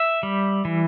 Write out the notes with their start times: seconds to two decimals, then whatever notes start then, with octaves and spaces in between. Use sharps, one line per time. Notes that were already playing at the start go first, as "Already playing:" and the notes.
Already playing: E5
0.23 G3
0.65 E3